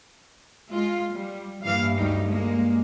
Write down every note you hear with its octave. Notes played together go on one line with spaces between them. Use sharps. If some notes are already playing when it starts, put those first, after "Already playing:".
G#3 F4
G3
G2 E3 A#3 F5
D2 G3 D#4
G#3 A#3